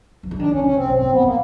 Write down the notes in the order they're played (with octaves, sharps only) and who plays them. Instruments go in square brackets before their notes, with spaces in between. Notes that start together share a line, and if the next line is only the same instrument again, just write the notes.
[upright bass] F3
E3
[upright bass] D#3 [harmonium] D4
[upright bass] D3 [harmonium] C#4
[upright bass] C#3 [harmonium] C#4
[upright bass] C3 [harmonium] C4
[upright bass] B2
[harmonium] C4
[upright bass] A2
[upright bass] A2 [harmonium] B3
[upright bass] A#2 [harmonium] A#3